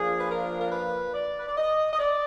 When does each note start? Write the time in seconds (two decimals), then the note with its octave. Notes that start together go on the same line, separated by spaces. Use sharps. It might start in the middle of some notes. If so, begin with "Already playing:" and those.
Already playing: F3 A#3 D4 F4 G#4
0.19 B4
0.30 A#4
0.60 A#4
0.72 B4
1.14 D5
1.38 B4
1.47 D5
1.57 D#5
1.93 D#5
1.99 D5